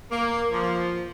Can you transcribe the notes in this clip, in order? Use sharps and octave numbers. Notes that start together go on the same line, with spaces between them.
A#3
F3